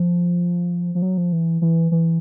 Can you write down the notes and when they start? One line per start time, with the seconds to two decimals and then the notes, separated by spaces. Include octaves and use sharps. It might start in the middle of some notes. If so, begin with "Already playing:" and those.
Already playing: F3
0.95 F3
1.02 F#3
1.18 F3
1.32 E3
1.62 E3
1.92 E3